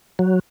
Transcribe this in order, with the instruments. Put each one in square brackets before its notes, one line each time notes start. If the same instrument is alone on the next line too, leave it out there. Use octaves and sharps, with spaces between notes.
[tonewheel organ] F#3